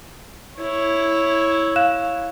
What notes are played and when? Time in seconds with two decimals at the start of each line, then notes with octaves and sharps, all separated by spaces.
0.59 E4 C#5
1.76 F5 F#6 E7